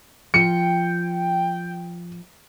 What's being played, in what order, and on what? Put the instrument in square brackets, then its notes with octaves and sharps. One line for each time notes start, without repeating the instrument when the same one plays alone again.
[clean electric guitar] F3 [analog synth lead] G5 [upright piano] C#7